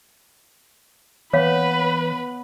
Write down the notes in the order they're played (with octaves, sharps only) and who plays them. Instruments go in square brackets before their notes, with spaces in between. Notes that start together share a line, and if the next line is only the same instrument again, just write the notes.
[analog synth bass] E3 [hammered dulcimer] B3 [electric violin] B4 B5 [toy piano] C#5 F5